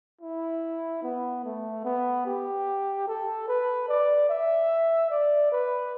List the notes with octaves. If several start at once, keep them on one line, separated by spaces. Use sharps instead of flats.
E4
B3
A3
B3
G4
A4
B4
D5
E5
D5
B4